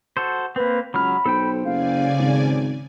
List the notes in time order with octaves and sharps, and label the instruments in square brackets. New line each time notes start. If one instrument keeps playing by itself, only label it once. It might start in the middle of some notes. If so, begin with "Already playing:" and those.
[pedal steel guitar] F#4 A4 C5
[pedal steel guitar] A#3 C4 [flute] B4
[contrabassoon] C#2 [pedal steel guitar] F#3 F6 [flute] B5
[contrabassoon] B1 [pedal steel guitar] A4 C5 G5
[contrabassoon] F#1 [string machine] C#3 D5 G#5 [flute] F5
[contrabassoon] G#1